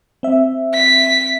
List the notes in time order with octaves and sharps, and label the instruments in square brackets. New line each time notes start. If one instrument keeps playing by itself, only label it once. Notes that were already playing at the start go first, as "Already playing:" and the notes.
[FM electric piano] C4 E5
[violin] B6